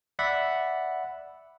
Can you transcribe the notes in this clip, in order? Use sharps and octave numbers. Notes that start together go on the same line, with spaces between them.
D5 E5 F#5 B5